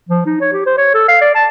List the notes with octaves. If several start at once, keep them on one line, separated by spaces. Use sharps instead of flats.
F3
D#4
C#5
G4
C5
C#5
A4
F5
D5
A5